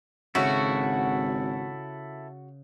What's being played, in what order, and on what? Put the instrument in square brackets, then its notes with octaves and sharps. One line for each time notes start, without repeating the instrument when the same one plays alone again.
[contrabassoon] G#1 [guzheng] C#3 [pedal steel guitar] E4 A4 E5 [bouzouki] F#4